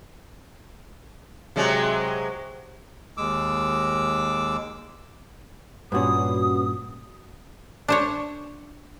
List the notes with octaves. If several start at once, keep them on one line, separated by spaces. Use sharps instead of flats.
C3 F#3 G#3
D#2 G#3 D6 E6
G2 A#2 C#4 F#4 B4 D#6
D4 C5 C#5